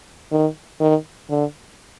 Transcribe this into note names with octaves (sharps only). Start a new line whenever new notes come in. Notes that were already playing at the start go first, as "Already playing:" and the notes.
D#3
D#3
D3